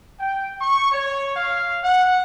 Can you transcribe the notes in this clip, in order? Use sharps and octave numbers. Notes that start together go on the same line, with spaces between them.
G5
C#6
C#5
F5
F#5